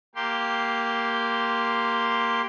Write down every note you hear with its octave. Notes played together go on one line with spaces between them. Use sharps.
A#3 G4 C6